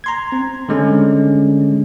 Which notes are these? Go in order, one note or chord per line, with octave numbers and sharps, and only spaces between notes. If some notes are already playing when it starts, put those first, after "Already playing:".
A#5 C6 G#6
C4
D3 G#3 C#4